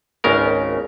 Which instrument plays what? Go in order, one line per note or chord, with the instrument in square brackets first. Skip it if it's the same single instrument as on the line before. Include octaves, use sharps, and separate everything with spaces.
[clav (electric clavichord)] G#1 C#2 C#3 A#4